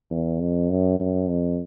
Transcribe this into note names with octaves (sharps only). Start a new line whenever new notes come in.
E2
F2
F#2
F#2
F2